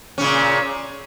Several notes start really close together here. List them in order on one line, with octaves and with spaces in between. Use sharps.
C#4 C#3 A#2